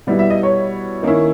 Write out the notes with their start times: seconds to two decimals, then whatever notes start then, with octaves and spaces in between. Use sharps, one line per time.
0.07 B2 G3 B3 E4
0.19 E5
0.30 D#5
0.43 C#5
1.03 D#3 A#3 C#4 E4